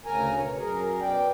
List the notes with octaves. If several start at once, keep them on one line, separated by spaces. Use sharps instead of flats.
D2 C#3 A#4 G#5 A#5
B2 C#5
F#2 G#4 A#4
B2 D5 G5